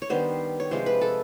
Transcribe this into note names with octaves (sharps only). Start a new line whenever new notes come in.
C#5
D#3 G3 B3 D4 C5
C#5
C3 F3 G#3 C5
B4
A4